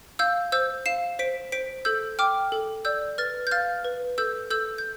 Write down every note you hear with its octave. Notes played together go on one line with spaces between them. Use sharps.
F5 E6 G6
C5 E6 G6
F5 C7 E7
C5 B6 D7
C5 B6 D7
A4 E6 G6
G5 D6 F6
A4
D5 E6 G6
B4 F6 A6
G6
F5 F6 A6
B4
A4 E6 G6
A4 E6 G6
G6